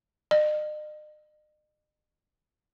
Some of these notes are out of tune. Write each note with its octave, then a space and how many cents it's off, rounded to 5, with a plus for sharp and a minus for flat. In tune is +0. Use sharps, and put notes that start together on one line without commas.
D#5 -45